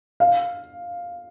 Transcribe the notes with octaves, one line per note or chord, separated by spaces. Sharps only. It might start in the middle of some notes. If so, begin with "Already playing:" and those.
F5